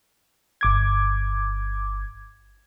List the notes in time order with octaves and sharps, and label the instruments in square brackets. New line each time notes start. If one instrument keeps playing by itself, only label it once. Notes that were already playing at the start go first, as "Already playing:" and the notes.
[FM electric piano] G1 D6 G#6